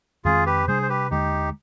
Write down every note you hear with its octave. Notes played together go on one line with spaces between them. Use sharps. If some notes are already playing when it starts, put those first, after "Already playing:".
F2 D#3 G#3 C4 F4 G#4
G4 B4
C3 G3 B3 D4 G#4 C5
C5
G4 B4
D#2 D3 G#3 D#4 G4